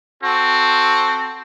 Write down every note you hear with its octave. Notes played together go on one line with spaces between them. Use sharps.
C4 F#4 A4